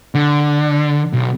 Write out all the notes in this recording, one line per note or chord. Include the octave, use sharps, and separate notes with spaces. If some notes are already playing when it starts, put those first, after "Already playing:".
D3
B1